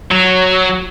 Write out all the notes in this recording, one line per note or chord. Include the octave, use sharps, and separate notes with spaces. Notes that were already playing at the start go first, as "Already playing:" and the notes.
F#3